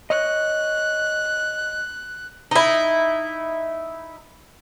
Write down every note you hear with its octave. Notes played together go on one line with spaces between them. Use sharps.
C#5 D#5 F#6
D#4 E4